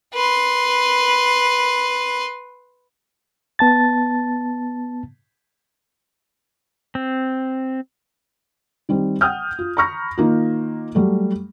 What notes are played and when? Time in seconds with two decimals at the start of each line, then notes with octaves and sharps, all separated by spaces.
0.14 B4 C6
3.59 B3 A5 A6
6.95 C4
8.89 D#3 G3 C4
9.21 F#5 G5 D#6 F6 G6
9.59 F4
9.77 A#5 B5 C#6 F6 A#6
10.17 D#3 A#3 F4
10.95 F#3 G3 A3